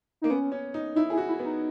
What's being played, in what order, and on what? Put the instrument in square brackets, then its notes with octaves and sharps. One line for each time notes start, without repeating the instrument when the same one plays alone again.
[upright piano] A#3 [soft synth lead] D#4
[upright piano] B3 [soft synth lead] C#4
[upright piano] C#4
D#4
[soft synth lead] D#4 [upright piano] E4
[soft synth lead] E4 [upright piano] G#4
[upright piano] F#4
[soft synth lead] E4
[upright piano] B3
[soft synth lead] D#4